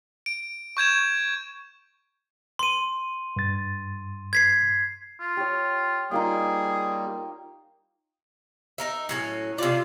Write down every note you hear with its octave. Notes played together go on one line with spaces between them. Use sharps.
D7
C#6 G6 G#6 E7
C6 D#7
G2 A6
G#6 B6 C7
F4
G4 C#5
G3 A#3 D#4 F4 G#4 G5
D#4 A#4 E5
A2 F#3 C#4
C3 F4 D5